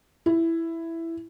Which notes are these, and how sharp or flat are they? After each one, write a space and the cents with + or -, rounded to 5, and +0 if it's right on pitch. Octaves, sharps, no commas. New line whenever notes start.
E4 +5